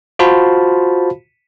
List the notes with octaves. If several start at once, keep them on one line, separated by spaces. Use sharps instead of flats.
F4 F#4 C5 F5 A5 B5